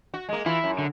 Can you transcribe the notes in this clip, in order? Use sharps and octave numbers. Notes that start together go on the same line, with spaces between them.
F#4
G#3 A#3
E3 E4 F4
F#2
D3